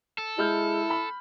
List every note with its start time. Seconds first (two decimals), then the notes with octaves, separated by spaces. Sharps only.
0.18 A4
0.38 G#3 E4 F6 G6
0.90 B5